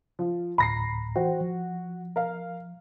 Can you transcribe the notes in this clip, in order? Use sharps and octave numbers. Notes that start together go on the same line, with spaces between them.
F3
D2 A2 A#5 B5 A#6 C7
E3 F#4 C5 G5
F3
A#4 F5